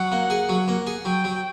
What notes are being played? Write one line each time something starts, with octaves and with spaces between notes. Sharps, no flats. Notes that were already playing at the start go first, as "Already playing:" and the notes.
Already playing: F#3 F#5
A#3
G#4
F#3
A#3
G#4
F#3 G5
F#3